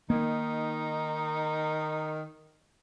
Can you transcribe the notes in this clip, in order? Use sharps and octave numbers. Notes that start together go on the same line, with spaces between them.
D#3 A#3 D#4